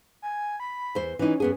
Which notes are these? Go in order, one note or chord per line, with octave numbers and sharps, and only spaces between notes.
G#5
B5
E2 C5
E3 C#4 D#4
F#2 B3 G#4